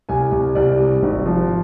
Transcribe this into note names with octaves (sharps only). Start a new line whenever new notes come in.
C2 G#5
C2
C2 D5
G3
G#1
F3